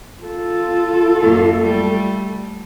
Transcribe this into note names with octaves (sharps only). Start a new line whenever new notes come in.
F4 A4
F#2 A#3
G3 A3